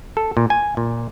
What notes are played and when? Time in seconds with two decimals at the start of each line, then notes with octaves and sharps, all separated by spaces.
0.17 A4
0.37 A#2
0.50 G#5
0.77 A#2